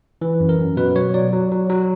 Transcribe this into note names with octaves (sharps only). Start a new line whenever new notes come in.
E3
F#2
A#4
F#2
B2 B4
F#3 C#5
F#3 D5
F#3
F#3
F#3